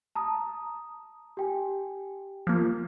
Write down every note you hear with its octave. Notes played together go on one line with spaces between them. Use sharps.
A5 A#5 D#6
G4 G5 G#5
F3 A#3